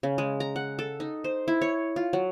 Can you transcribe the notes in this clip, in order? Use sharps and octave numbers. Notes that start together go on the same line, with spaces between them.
C#3
G#3
A#5
F#5
A4
D#4
C5
E4
C#5
F4
F#3